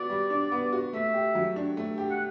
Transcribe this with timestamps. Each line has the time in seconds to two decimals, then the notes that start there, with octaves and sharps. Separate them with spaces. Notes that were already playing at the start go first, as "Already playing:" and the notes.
Already playing: B3 F#4 D5
0.10 G3
0.30 D4
0.52 B3
0.72 F#4
0.93 A3 E5
1.14 G4
1.35 F#3
1.56 D4
1.77 A3
1.98 G4
2.11 F#5